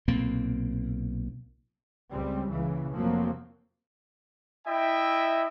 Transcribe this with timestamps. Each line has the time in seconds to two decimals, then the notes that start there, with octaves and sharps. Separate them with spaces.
0.08 B1 A#2 A#3 C4
2.11 C#2 G3 C4
2.50 C#2 A#2 C#3 E3
2.96 F1 F3 F#3 A#3 C4
4.66 E4 D#5 E5 G5